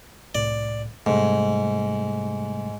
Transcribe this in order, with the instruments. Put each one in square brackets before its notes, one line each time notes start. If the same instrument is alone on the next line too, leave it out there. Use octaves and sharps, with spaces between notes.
[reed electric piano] C2 A2 [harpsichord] D5
[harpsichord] G#2 [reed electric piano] C3 G3 A3